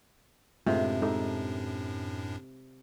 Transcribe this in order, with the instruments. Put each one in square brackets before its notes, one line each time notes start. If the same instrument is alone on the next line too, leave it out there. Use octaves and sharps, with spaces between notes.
[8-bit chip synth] F#2 A2 D4 [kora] C3 [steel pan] G#3 A3 F4
[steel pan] G#3 D#4 A4